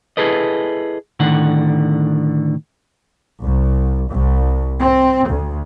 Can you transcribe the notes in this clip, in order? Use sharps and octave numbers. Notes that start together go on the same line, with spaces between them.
E4 G#4 A4 B4 D#5
A2 D3 D#3 F#5
C2
C2
C4
D2